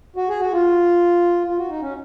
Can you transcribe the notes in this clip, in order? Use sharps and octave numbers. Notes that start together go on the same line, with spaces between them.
F#4
G#4
F#4
F4
F4
F#4
D#4
C#4